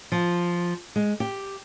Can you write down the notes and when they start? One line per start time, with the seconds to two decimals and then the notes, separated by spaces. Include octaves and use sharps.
0.12 F3
0.96 G#3
1.20 G4